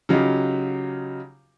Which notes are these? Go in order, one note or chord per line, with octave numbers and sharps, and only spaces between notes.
C#3 F#3 D#4 F4 G4